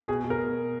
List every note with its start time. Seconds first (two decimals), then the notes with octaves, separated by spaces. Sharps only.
0.08 B2 G#4
0.24 B2
0.30 A#4